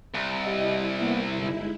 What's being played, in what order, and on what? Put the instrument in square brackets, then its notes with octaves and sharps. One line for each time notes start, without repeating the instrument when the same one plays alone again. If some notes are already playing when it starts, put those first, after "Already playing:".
[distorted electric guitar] C2
[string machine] E4 [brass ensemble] G4 D#5
[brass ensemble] A#3 B3
[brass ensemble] G1 [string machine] G#3 D#4 E4